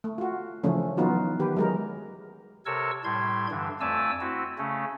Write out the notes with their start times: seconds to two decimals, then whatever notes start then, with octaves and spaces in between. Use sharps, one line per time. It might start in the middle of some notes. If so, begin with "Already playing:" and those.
0.04 A3
0.18 F4 F#4
0.64 C#3 E3 F3 A3 C#4
0.97 E3 F#3 B3 D#4 F4 F#4
1.39 D#3 G4 B4
1.56 F#3 G#3 A#4
2.66 C3 A4 A#4 C#5 C#6 E6
3.04 A2 G3 C6 G#6
3.51 G2 D3 E3
3.81 F2 A3 D5 G#5 A5 E6
4.21 C4 E4 F#4
4.58 C#3 A3 C#4